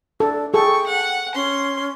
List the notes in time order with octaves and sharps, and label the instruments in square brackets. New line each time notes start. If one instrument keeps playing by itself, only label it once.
[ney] D4 [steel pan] A4
[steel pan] G#4 A4 [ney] G5 [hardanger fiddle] C#6
[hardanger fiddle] F#5
[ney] C#4 [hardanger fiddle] C6